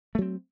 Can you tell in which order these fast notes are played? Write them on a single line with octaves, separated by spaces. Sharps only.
A3 F#3 C4